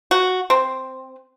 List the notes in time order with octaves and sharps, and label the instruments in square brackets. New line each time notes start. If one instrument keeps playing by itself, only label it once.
[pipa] F#4
C4